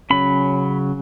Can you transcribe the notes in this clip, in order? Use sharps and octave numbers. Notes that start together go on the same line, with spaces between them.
C#3 F#3 C#4 B5